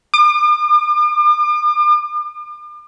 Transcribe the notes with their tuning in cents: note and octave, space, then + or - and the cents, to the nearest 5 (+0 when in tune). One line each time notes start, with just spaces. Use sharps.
D6 +40